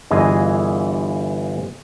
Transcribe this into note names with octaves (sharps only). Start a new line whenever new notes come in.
G1 E3 G#4 D#5